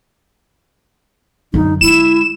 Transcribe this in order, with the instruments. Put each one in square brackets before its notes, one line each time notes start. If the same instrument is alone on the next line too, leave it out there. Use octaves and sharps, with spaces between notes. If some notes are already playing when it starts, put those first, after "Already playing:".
[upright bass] F#2 D3 [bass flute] D#4
[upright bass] D3 G#3 [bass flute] E4 [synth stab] E7